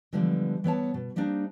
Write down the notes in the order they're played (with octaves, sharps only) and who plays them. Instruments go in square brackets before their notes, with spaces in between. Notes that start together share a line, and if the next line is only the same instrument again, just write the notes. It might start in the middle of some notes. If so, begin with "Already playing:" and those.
[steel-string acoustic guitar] D3 E3 F3 G3 G#3 B3
E3 B3 C#5 A5
B2
G3 A#3 C4 D4 D#4